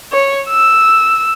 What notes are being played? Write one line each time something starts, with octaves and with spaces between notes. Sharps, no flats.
C#5
E6